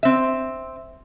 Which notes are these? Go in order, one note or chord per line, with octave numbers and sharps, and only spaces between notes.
C4 E5